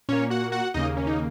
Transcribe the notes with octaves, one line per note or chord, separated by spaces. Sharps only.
A#2 A#3 C#4 C#5
F#4 F#5
F#4 F#5
D#2 C#3 A#3 D#4 D#5
C#4
D#4